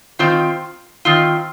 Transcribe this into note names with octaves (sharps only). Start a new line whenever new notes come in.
D#3 C4 F4
D#3 C4 F4